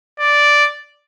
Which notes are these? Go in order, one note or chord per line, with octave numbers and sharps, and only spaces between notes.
D5